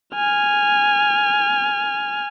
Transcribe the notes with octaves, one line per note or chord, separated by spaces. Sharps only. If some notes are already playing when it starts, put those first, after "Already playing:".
G#5 F6